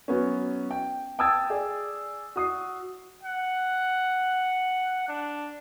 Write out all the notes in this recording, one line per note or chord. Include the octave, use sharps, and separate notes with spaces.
F#3 B3 C#4
G5
G5 A5 D#6 E6 G#6 A6
G#4 D5
F#4 D#6 C7
F#5
D4